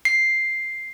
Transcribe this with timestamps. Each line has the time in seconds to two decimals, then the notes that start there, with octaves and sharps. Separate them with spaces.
0.05 C7